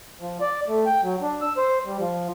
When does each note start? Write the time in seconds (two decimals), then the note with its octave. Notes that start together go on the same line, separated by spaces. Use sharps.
0.20 F3
0.41 D5
0.68 A3
0.86 G5
1.03 F#3
1.22 D4
1.41 E6
1.57 C5
1.85 G3
1.99 F3